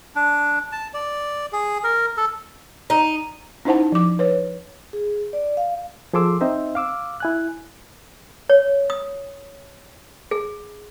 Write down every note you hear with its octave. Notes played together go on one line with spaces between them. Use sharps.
D4
A5
D5
G#4
A#4
A4
D#4
C#4 D#4 E4 C5 F#5 A5
F3 D6
B4 C#5
G#4
D5
F5
F3 G#4 A4 C6 D6 E6
C4 D#4 C5 D#5 E5
F5 D6 E6
E4 G#5 F#6
C#5
D#6
G#4